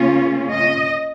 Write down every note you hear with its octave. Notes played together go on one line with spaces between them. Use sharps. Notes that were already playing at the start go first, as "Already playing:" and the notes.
Already playing: C#3 A#3 C#4 F4
D#5